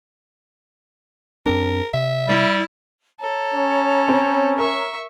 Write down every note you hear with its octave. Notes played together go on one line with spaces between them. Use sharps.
F#2 C4 D4 A#4
C3 E5
G3 E4
A4 C#5 A#5
C#4
C4
A#4 E5 C#6